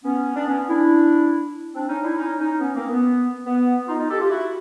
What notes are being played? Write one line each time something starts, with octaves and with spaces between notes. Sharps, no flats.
B3 C#4
D4
B3 C#4
D4 E4
C4 D4
C#4 D#4
D4 E4
C#4 D#4
C#4 D#4
B3 C#4
A#3 C4
B3
B3
D#4 F4
D#4 F4
G4 A4
F4 G4
E4 F#4